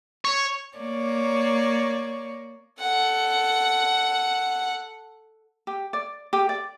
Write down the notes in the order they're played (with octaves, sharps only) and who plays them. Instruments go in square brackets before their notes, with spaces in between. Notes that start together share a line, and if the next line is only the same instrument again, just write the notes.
[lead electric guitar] C#5
[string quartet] A#3 C#5 D5
[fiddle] A4 F#5
[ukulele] G4
D5
G4
D5